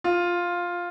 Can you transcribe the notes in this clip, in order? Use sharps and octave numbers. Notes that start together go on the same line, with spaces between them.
F4